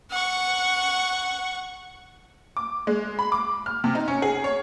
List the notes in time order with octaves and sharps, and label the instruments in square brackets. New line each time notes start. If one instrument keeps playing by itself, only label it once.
[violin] F#5 C#6
[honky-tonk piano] D6
G#3
B5
D6
F6
C3
D#4
C#4
G#4
C#5